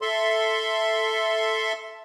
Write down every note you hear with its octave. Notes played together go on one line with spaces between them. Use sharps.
A4 E5 C6